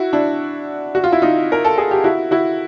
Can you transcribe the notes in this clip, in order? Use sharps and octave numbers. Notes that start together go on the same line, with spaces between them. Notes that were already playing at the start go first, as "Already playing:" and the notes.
Already playing: E4 F#4
D4 E4
F#4
F4
E4
D#4 F4
A#4
A4
G#4
G4
E4 F#4
E4 F#4